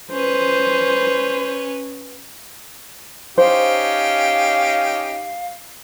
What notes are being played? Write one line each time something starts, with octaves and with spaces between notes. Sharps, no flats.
C#4 B4 C5
C#4 D#4 G4 C5 F5